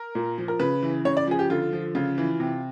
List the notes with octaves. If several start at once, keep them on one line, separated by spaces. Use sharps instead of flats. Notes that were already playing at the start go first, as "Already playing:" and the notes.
Already playing: A#4
A#2
F3
A#4
C#3 B4
E3
C#3 C#5
D5
F3 G#4
G4
D3 F4
F3
C#3 F4
E3
C3